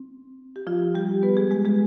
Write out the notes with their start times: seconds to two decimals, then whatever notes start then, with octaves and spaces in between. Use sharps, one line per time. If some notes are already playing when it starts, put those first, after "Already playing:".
Already playing: C4
0.56 G4
0.67 F3 F4
0.95 G3 G4
1.23 B3 B4
1.37 G#3 G#4
1.51 G#3 G#4
1.65 G#3 G#4